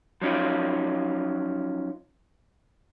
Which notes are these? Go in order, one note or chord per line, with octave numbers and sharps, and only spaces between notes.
F3 F#3 C#4 D#4 F4